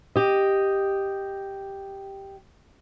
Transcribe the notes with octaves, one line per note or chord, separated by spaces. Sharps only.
G4 D#5